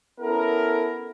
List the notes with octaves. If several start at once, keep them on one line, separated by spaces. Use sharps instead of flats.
B3 C#4 E4 A4 A#4